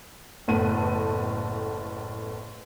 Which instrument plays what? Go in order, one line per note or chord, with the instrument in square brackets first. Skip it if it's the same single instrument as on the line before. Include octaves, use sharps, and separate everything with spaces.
[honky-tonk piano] F#1 A2 A3 B3 F#5 D#7